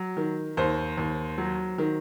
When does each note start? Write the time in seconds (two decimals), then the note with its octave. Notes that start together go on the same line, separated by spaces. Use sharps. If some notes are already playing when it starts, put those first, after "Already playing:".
Already playing: F#3
0.17 D#3
0.57 D#2 C5
0.98 D#2
1.38 F#3
1.78 D#3